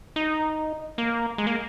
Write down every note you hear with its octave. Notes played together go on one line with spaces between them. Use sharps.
D#4
A#3
G#3
A#3